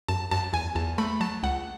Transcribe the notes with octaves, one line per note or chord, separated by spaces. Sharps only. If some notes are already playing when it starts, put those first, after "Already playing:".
F#2 A5
F#2 A5
E2 G#5
E2 A5
A3 B5
F#3 A5
C#2 F#5